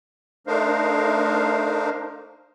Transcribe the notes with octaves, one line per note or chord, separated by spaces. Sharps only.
A3 D4 D#4 A#4 C5 F5